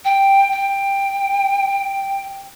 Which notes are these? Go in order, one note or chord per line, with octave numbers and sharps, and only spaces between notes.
G5
G5